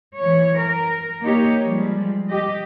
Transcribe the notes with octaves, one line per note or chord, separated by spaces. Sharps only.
E3 C#5
A#4
A#3 D#4 G4 C#5
F3 G3 G#3
G4 D#5